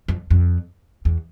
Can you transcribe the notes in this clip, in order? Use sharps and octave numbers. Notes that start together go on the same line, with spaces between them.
F2
F2
E2